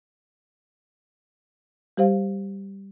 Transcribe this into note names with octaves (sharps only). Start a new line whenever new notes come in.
G3 G4 C5 F5